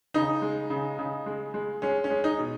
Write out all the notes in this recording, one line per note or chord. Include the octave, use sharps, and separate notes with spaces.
C#3 D#4
G#3
C#3
C#3
G#3
G#3
G#3 C#4
C#4
G#3
D#4
B2